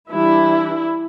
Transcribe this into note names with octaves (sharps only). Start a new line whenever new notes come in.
E3 G3 D4 E4